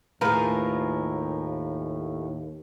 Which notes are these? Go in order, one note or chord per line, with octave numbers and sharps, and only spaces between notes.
D#2 A2 F3 G#4 A#4 B4